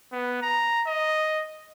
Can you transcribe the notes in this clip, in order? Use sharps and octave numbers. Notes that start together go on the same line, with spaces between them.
B3
A#5
D#5